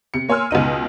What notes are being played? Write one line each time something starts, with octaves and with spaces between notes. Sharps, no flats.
C3 C#7
A#3 C#5 G#5 C6 E6 F6
C#2 B2 D#4 D#7